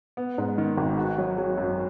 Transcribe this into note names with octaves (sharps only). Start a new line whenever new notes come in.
B3
G#2
D#3
G#1
F#4
F#3
F#3
F#2